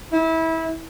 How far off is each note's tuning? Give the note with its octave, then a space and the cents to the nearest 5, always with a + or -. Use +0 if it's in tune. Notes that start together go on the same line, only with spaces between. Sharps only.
E4 -25